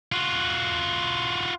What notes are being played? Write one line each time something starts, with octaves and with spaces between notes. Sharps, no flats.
F4 F#4